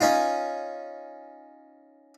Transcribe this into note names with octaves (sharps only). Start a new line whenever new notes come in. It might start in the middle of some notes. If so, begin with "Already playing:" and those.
C#4 D#4 F4